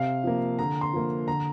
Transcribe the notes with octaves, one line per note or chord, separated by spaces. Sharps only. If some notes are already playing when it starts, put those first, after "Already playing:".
Already playing: C3 F5
F3 A#3
D3 A#5
C6
F3 A#3
D3 A#5